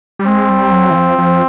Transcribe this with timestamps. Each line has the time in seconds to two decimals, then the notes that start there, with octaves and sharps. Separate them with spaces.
0.19 G3
0.26 G#3 C4
0.50 G3
0.72 F#3
0.91 E3
0.95 F3
1.18 F3